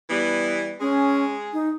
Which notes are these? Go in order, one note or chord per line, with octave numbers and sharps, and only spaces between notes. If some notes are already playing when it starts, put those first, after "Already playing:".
E3 G3 B3
G#3 C#4 G#4
D#4